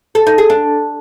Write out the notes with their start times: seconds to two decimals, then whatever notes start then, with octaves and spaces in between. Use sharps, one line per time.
0.15 A4
0.27 D#4
0.38 G#4
0.50 D4